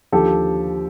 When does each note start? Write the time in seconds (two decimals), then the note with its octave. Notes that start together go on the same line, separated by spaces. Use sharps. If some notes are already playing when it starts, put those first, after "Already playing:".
0.12 D#2 D3 F3 G4 A4